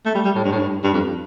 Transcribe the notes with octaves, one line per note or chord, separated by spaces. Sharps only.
A3
G3
G3
A2
G2
A2
G2
G2
F2